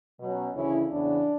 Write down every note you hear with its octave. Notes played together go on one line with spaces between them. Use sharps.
B2 F#3 C#4
D2 C#3 E3 C#4 E4
E2 C#3 E3 B3 D4